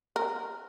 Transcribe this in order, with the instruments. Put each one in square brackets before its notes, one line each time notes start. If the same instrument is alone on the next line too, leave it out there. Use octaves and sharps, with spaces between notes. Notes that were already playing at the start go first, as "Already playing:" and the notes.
[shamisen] A#4